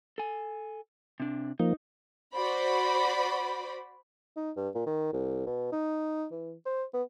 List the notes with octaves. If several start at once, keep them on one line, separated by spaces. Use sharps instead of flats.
A4 G#5
C3 D4
F3 A#3 D#4
F#4 C5 D5 B5
D#4
G2
A#2
D#3
C2
B2
D#4
E3
C5
B3